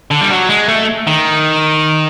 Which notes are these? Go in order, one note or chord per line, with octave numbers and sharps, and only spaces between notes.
D3
G3
F#3
G#3
A3
D#3